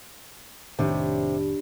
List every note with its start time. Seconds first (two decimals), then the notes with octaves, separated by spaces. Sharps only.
0.79 F1 A2 C3 D#3 D4 B4 C#5